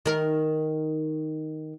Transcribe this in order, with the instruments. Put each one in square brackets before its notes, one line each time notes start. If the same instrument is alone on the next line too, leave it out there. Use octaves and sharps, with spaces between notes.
[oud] D#3 A#4